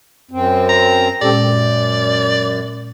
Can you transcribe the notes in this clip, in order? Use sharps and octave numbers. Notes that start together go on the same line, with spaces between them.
F#2 C4
A#5
A#2 G#3 C4 C#4 G4 A4 D5
F#2